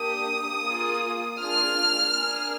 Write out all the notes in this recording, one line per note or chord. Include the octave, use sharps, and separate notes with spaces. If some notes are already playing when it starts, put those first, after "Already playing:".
Already playing: A#3 D4 G4 D#6
A#3 F4 G#4
A#3 D4 F4 G#4 F6
A#3 D4 G#4